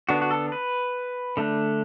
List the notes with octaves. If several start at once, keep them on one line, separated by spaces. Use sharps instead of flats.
D3 B3 D4 F#4
F#4
A4
B4
D3 A3 D4